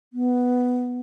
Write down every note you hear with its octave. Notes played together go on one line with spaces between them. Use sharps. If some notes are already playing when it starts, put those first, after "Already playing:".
B3